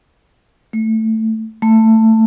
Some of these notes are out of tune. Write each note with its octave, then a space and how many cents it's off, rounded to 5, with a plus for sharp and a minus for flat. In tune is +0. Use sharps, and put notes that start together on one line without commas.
A3 +10
A3 +15